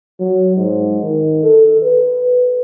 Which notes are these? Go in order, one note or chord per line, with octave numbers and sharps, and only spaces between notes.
F#3
G#2
D#3
A4
B4